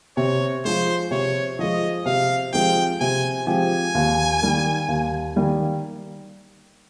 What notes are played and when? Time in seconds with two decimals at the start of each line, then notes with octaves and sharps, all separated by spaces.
0.17 C3 C#5
0.65 F3 G#3 C5
1.11 C3 C#5
1.59 F3 G#3 D#5
2.06 C3 F5
2.53 F3 G#3 C4 G4 G5
3.00 C3 G#5
3.47 F3 G#3 C4 G4 G#5
3.95 D#2
4.42 D#3 G3 A#3
4.88 D#2
5.36 D#3 G3 A#3